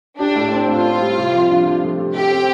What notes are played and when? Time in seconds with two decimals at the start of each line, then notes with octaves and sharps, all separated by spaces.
0.18 D4 G4
0.35 A2
0.52 C4
0.68 A2 F4
0.84 C4
1.00 G3
1.17 C3
1.33 F3
1.50 D4
1.66 F3
1.83 A3
1.99 C3
2.15 G4 A4
2.31 C4